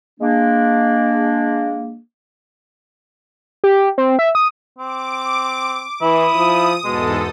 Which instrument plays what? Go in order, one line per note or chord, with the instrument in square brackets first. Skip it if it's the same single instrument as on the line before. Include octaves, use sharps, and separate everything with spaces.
[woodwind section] G#3 A#3 D4
[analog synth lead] G4
C4
E5
D#6
[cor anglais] C4 [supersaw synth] D6
[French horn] E3 [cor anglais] E4 [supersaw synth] D#6
[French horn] F3
[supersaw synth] E2 G#2 A4 [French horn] B2 [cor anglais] G#3